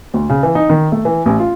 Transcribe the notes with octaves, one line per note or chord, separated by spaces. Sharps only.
D2
C#3
E3
D#4
D#3
A3
E3
A1
F4